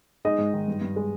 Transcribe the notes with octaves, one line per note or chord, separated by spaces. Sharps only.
G#3 D#4 D#5
G#2
D#3
G2
G2
G#3